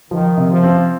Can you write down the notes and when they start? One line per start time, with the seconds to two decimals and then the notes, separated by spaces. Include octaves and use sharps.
0.11 D#3 F3
0.37 C3
0.50 F3
0.63 C4